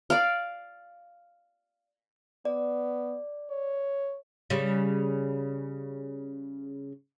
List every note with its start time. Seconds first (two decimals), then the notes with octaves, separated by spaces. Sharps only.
0.10 D5 F5
2.45 B3 D5
3.50 C#5
4.50 C#3 G3